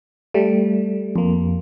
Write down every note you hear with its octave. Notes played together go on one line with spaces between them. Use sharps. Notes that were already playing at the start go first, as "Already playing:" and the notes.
G3 A3
F2 A#3